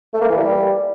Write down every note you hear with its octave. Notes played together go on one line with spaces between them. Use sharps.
A3
A#3
E3
G3